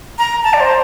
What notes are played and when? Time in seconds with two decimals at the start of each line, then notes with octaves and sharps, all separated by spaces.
0.18 A#5
0.44 A5
0.53 D5
0.60 C5